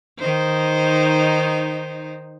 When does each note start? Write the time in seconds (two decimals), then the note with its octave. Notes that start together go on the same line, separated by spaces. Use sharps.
0.19 D#3 D#4 C5